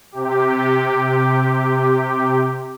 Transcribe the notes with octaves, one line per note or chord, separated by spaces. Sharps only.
C3 G4